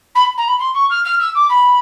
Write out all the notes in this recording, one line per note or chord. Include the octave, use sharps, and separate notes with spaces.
B5
A#5
B5
C6
C#6
F6
F6
E6
D6
B5